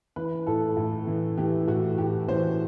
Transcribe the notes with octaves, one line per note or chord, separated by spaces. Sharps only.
E3 B4
A2 A4
A2
E3
E3 G4
A2 F#4
A2 G4
E3 C5